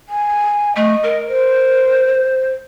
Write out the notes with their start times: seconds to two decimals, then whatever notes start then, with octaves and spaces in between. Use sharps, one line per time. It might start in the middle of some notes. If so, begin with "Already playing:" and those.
0.09 G#5
0.76 A3 D#5
1.04 A#4
1.28 C5